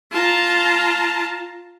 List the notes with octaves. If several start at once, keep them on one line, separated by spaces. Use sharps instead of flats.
F4 A5 A#5